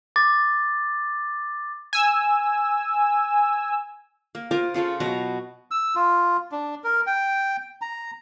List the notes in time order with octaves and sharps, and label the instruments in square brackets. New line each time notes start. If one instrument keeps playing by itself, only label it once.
[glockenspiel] D6 A6
[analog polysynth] G#5 E6
[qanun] A#3
F4 A#4 C5 D6
C#3 F4 A4 C#5
B2 F#3 F#4 A#5
[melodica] E6
F4
D4
A#4
G5
A#5